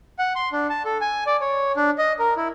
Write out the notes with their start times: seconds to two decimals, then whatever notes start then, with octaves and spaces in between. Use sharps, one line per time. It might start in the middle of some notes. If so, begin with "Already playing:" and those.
0.19 F#5
0.36 C6
0.52 D4
0.70 A5
0.85 A4
1.01 G#5
1.27 D5
1.41 C#5
1.77 D4
1.98 D#5
2.19 A#4
2.37 E4